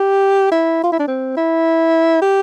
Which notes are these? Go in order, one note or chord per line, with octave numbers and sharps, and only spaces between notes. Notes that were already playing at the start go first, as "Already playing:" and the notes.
Already playing: G4
E4
F4
E4
D4
C4
E4
G4